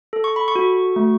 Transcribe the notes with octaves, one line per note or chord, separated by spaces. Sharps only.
A4
C#6
B5
C#6
F#4
A3